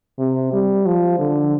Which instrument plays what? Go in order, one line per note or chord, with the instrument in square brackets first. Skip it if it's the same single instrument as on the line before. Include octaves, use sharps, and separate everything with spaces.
[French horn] C3
G3
F3
D3